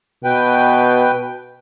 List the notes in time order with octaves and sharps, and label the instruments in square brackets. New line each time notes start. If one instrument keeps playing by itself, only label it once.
[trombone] B2 [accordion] B4 G5